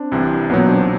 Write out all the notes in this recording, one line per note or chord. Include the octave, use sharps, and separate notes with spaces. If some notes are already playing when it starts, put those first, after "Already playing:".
Already playing: C4 D4
C2 C3 E3
B1 A#2 F#3 B3 C#4
C4 D4